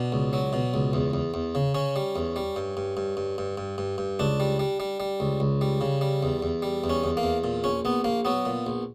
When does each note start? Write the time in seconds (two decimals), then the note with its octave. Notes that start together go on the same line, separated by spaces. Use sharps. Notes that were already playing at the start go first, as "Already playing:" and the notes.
Already playing: B2 D4
0.12 C#2
0.33 F#3
0.53 B2
0.74 C#2
0.93 E2
1.13 E2
1.34 E2
1.55 C#3
1.74 C#3 C#4
1.96 G3
2.16 E2
2.36 G3
2.56 G2
2.77 G2
2.97 G2
3.17 G2
3.38 G2
3.58 G2
3.78 G2
3.98 G2
4.19 C#2 D4
4.40 G3
4.59 G3
4.80 G3
5.00 G3
5.20 C#2
5.40 C#2
5.61 G3
5.81 C#3
6.01 G3
6.23 E2
6.43 E2
6.62 G3
6.84 E2
6.90 C#4
7.04 E2
7.17 A#3
7.23 E2
7.44 A#2
7.64 A#1 C#4
7.85 A#1 B3
8.04 A#1 A#3
8.25 F#3 B3
8.45 A#2
8.67 A#1